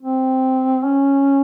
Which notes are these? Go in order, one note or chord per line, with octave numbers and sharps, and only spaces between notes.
C4
C#4